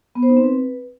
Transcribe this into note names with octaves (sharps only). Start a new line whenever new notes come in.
B3
C5
D#4
C4
B4